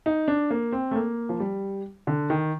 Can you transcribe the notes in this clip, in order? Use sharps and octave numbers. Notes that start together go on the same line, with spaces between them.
D#4
D4
A#3
C4
A3
A#3
F3
G3
D3
D#3